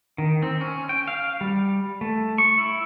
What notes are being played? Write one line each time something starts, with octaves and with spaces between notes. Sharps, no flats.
D#3
C4
C#4
G5
F5
G3
A3
C#6
E4